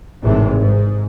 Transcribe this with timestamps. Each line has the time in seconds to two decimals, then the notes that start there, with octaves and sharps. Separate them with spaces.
0.22 G#1 A2 C3 E3
0.59 G#2